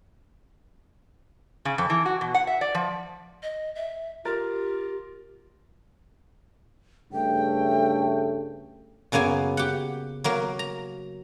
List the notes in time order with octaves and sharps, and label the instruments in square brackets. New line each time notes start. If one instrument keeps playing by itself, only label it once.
[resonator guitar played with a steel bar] C#3
F2
E3
F#4
B2
F#5
E5
D5
F3
[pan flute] D#5
E5
[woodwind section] F4 [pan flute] G4 [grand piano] A#4 A6
[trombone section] G2 C#3 A3 [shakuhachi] G5
[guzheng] F#2 C#3 A#3 B3 G#5
G4 F#5
F#3 A#3 A#4
A#5